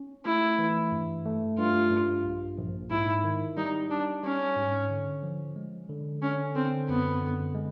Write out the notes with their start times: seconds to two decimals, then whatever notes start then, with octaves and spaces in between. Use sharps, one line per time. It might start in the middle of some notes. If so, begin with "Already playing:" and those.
Already playing: C#4
0.25 A3 E4
0.59 E3
0.92 G2
1.25 A3
1.58 G2 F4
1.91 G2
2.25 A#1
2.57 A#1
2.90 G#2 E4
3.24 D#3
3.57 G3 D#4
3.89 G3 D4
4.23 G3 C#4
4.56 G#2
4.90 D3
5.23 F3
5.56 G#3
5.89 D3
6.22 D3 C#4
6.55 D3 C4
6.88 F#2 B3
7.21 D3
7.54 G#3